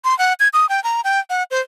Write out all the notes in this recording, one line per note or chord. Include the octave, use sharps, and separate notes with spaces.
C6
F#5
G#6
D#6
G5
A#5
G5
F#5
C5